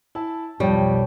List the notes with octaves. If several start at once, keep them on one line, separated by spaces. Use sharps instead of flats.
E4 A5
B1 F2 G3 C#5 G5